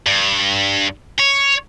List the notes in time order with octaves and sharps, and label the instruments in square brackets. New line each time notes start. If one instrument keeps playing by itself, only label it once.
[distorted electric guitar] G2
C#5